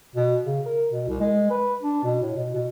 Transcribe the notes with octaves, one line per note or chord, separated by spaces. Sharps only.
B2
C#3
A#4
B2
C2
G#3
B4
D4
B2
A2
B2
B2